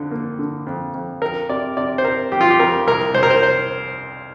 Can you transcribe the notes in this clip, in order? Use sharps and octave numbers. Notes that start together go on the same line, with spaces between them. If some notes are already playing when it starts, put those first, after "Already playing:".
Already playing: F2 D3
A#3
D3
F2
F2
F2 A#4
C3 D5
C3 D5
C5
C3 A#4
G3 G4
F4
G4
F2 A#4
C2 A#4
C2 C5
A#4
C5
C5